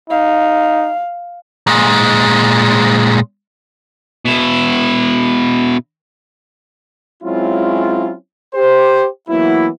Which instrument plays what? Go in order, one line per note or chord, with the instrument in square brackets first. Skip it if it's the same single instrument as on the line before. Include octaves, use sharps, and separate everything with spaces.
[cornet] D#4 [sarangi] F5
[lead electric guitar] A#2 G#3
[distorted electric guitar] B2 E4
[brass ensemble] F#3 G#3 C4 C#4 E4 F4
G4 C5
E3 F#3 A#3 B3 E4